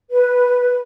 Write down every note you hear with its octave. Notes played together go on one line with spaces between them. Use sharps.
B4